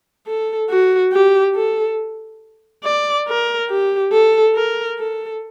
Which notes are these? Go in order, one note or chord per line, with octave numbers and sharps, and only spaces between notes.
A4
F#4
G4
A4
D5
A#4
G4
A4
A#4
A4